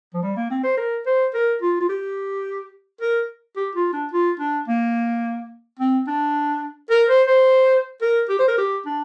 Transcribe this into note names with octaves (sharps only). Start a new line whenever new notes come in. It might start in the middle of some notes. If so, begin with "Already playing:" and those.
F3
G3
A#3
C4
C5
A#4
C5
A#4
F4
F4
G4
A#4
G4
F4
D4
F4
D4
A#3
C4
D4
A#4
C5
C5
A#4
G4
C5
A#4
G4
D4